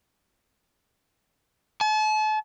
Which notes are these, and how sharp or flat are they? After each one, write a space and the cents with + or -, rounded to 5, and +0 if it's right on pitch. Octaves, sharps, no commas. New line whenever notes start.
A5 -40